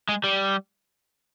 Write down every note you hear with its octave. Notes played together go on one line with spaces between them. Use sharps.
G#3
G3